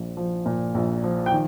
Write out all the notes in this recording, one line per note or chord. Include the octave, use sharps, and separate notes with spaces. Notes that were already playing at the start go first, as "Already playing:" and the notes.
Already playing: A#1 F3
F3
A#2
A#1
F3
G5
D#3